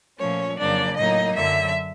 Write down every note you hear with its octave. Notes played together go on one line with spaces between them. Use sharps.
A#2 F3 A3 C#4 C#5
F2 C#3 F#3 A#3 D4 D5
A2 F#3 A#3 D#4 D#5
F#2 D3 F#3 E5